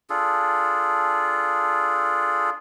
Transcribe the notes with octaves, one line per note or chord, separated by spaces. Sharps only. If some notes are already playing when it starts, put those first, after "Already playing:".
D4 F4 G#4 A4